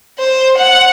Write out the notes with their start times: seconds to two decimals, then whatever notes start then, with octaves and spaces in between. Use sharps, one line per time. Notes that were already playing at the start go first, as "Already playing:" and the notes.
0.19 C5
0.58 F#5